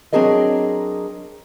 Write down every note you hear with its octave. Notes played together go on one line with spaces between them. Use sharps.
F#3 C4 D4 G#4 A#4 D#5